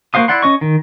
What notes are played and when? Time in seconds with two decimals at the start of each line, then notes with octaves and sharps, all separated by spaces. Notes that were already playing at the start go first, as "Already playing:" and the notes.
0.14 A#3 F#4 C5 F5 D#6
0.28 E4 D5 F#5 C6
0.42 C#4 D#5 C#6
0.61 D#3